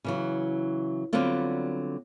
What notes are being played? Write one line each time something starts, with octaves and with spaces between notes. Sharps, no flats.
C#3 E3 F#3
D3 F#3 G3 B3 C4 F4